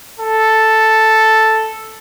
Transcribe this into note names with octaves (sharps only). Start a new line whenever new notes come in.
A4